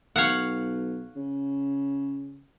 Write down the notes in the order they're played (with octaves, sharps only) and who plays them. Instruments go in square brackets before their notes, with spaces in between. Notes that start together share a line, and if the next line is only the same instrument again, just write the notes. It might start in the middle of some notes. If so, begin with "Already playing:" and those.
[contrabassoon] B1 [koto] C#5 F5 F#5
[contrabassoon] C#3